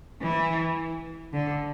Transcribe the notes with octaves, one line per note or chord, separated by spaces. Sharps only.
E3
D3